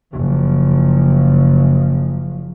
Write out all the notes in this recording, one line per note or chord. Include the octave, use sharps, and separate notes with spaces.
F#1 F3